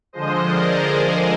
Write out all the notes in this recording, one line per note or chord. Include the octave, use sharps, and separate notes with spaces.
D3 F3 G#3 C5 D#5
A#4 D5
G#4 C5